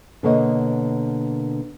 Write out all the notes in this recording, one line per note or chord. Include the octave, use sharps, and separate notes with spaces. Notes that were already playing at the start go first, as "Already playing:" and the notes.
B2 D3 A#3 C#5 D#5